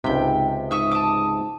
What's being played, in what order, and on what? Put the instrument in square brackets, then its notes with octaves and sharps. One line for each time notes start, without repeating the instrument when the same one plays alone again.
[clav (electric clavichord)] C#2 C3 [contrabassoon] G#2 [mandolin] G5 B5
[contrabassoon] G#2 [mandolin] E5 C#6 E6 [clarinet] D#6
[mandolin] A5 D6